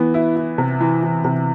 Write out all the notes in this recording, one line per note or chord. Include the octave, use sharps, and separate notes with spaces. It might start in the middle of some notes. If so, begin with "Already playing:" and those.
Already playing: E3 B3
E4
E4
C3
E3
E3
C3